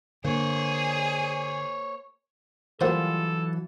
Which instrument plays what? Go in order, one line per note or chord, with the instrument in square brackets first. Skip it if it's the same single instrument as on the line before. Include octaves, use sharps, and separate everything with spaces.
[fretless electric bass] D3 [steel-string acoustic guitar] A#3 [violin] G#4 [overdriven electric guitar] C5 C#5
[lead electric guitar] E3 F#3 [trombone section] G3 F4 [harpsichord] A#3 F#4 C5 [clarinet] A4